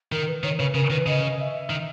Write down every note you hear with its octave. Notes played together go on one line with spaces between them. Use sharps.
D#3 A#4
B4
D#3 C#5
C#3 B4
C#3 A#4
D#3 B4
C#3 D#5
E5
D#3